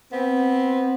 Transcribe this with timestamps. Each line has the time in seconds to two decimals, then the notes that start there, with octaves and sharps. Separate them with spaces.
0.12 B3 C4